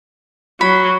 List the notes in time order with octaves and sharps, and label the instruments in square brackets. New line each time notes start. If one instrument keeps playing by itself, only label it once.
[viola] F#3 [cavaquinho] B5